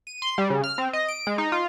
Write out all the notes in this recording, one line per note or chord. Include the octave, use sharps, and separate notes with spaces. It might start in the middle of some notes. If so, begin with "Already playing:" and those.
D#7
C6
G3
C#3
F6
C4
D#5
D7
G#3
D#4
F4